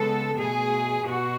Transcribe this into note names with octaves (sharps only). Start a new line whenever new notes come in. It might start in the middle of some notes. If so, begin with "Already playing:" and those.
Already playing: C#3 G#3 B3 A4
B2 A3 G#4
B2 F#4